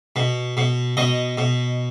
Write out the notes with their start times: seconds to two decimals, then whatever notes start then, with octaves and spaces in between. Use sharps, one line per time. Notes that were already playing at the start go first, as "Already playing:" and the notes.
0.16 B2
0.57 B2
0.97 B2 D#5
1.38 B2